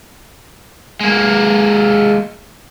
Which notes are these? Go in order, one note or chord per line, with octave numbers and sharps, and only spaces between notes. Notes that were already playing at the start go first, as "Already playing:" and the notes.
G#3 A#3